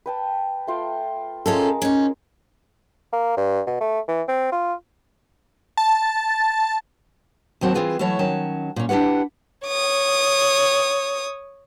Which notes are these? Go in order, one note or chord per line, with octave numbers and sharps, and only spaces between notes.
B4 G5 A5
A3 F4 G5
G#3 C#4 F4 A4 A#4
C#4 D#4
A#3
G2
B2
A3
E3
C4
F4
A5
D#2 F#3 C4 F#4 A5
E3 F#3 C4 F4 G#4 B4
E3 F#3 A3 E4 C#5 A5
D#3 F#3 C#4 A5
A#2 C#4
D4 E4 G4 B4 F#5
C#5 D#6